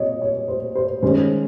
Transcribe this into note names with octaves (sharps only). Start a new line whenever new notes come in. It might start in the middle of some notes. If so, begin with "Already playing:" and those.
Already playing: A#2 C4 C#5 D#5
C#5
C5
C5
D#3 G#3 C#4 C5